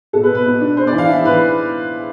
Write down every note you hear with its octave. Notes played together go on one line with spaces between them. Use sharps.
B2 A4
B4
B2
B4
B2
D4
B3 C5
D5
E3
F5
E3 E5
E3 B4